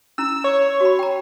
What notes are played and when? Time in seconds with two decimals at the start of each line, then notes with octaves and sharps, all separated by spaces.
0.18 C#4 E4 A#5 E6
0.44 C#5
0.80 F#4 B5
0.99 G5 A#5